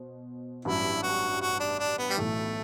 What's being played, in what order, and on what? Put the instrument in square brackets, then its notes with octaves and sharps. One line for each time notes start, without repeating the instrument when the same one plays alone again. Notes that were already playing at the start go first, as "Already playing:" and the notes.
Already playing: [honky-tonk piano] B2 C5
[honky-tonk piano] A1 G2 F#3 [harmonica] E4
[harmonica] F#4
F#4
D4
D4
B3
G3
[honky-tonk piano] B1 A2 E3 [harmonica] A3